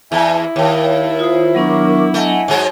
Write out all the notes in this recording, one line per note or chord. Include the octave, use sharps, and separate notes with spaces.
E2 E4 E5 G#5 A5
D#2 C#5 F5 G5
F4 C5 F5 D#6
F#3 B3 D4 A#4 C#6 D6
A3 D#5 F#5 G#5
G#2 F#3 G#3